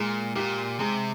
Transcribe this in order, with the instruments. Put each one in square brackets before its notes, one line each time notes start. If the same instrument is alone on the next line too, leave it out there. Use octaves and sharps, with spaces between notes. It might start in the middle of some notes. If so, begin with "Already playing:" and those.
Already playing: [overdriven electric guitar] A#2 [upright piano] G#3
[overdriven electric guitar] A#2 [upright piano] G4
[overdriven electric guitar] C3 [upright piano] G#3